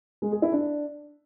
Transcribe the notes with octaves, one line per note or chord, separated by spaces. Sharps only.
G#3
G#4
E4
D4